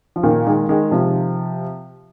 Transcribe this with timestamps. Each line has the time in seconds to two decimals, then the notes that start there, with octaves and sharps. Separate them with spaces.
0.16 F3
0.23 A#2 D#3
0.46 D#3 G#3
0.69 D#3 G#3
0.91 C3 F3